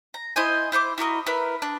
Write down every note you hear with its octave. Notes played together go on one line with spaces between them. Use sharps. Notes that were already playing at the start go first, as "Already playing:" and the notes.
A#5
E4 C5 D#5 G#5
E4 C5 C6 D6
E4 F#4 A#4 D#5
E4 A#4 B4
D4